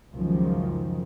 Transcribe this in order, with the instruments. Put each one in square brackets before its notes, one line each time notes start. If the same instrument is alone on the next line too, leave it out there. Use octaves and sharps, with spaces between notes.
[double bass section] C#2 F#2 D#3 F3